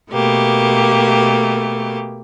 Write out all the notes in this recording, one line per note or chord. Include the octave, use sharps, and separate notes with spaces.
B2 A3 A#3 G4